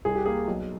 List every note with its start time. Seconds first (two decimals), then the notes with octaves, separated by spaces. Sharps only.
0.05 C2 G#4
0.15 G4
0.26 A#3 G#4
0.48 B1